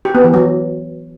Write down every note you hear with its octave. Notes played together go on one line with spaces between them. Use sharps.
G4
B3
E3
F#3